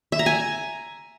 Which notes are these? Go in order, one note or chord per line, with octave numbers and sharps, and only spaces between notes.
E5
A#5
G#5